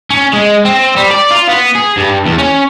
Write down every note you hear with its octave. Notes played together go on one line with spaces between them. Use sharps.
C#4
G#3
C4
G3
D5
F4
B3
G#4
G2
E2
C#4